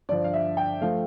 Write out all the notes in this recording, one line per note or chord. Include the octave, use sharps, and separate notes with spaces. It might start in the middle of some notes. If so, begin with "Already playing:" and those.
G2 D3 F3 D5
F5
E5
G5
F3 A3 F5